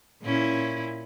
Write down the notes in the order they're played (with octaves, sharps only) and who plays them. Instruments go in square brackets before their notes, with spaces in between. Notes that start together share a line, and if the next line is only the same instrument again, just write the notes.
[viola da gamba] A#2 C#4 E4